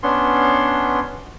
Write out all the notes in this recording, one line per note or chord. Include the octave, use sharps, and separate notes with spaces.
B3 C#4 D4 C6